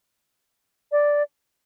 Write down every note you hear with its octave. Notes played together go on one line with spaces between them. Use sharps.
D5